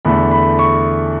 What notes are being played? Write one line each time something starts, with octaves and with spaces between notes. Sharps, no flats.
E2 D3 A3 B5
B5
C#6